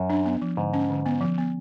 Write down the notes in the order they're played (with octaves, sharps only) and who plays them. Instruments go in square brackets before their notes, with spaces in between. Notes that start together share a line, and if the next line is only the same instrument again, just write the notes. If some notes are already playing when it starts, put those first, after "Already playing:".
Already playing: [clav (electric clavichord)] F#2
[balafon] D4
B3
F3
[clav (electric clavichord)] G#2 [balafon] D3
[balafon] C#4
D3
B3
F3
B3